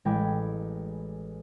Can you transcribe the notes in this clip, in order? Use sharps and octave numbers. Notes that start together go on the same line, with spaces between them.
A1 G#3 G5 B5 D6 G#6